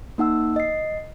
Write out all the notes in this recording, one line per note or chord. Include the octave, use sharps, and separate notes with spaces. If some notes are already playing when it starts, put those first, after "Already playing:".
A#3 D#4 F#5 E6
D#5 C7